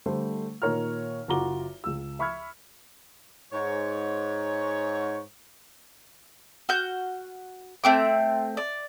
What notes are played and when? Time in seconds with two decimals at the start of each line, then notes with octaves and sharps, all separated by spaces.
0.06 D3 G3 A3 C5
0.62 A#2 D#3 A#4 C#5 A#5 F6
1.28 F#1 F4 F#4 A#5 D6 G7
1.84 C#2 E6
2.19 E5 B5 C#6 E6 F6 G#6
3.53 G#2 C#5
6.69 F#4 F6 G6
7.84 A3 C4 D6
8.57 D5